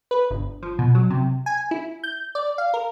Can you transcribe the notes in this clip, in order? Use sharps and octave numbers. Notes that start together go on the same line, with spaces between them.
B4
G1
F3
B2
F#3
C3
G#5
E4
G6
D5
F5
A#4